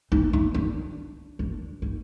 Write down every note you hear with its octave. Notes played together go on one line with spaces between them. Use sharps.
D#4
D4
D4
D4
D#4